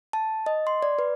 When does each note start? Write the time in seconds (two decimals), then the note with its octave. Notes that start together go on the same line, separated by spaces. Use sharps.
0.13 A5
0.46 D#5
0.67 C6
0.82 D5
0.99 B4